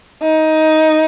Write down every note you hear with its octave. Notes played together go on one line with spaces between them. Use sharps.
D#4